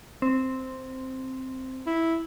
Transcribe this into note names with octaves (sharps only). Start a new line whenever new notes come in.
C4
E4